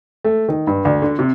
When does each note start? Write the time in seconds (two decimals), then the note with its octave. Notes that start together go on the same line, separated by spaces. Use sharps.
0.24 A3
0.49 D#3
0.67 G2
0.85 D2
1.02 D3
1.19 C3